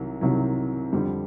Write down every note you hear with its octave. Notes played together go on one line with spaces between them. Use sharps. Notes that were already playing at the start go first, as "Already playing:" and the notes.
Already playing: C2 C3 D#3 F#3
C2 C3 D#3 F#3
F2 D3 G3